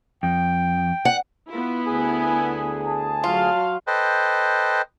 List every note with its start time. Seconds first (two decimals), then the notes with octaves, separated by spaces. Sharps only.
0.23 F2 G5
1.05 F#5
1.50 B3 E4 F4
1.86 D2 G#4 G#5
2.86 A5
3.24 F#3 F4 F5
3.87 A4 B4 C5 D#5 G5